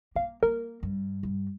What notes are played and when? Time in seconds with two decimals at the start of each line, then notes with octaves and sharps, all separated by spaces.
0.16 A#3 F5
0.43 A#3 A#4
0.83 G2
1.23 G2